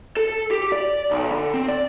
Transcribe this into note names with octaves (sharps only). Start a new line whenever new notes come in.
A4
G4
D5
B1
D3
C4
D5